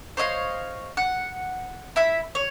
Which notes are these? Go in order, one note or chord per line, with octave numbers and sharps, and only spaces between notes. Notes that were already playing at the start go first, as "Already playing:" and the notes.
C5 C#5 D#5 F5
F#5
E4 E5 B5
C#5